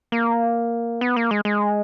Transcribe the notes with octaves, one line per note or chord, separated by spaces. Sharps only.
A#3
B3
A#3
G#3
G#3